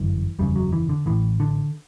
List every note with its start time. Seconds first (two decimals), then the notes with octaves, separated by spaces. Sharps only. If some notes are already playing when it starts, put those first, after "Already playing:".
Already playing: G1 F#2 D3 E3
0.39 F#1 E2 C#3 G3
0.56 F#3
0.73 E3
0.89 D3
1.06 A1 A2 E3
1.40 D3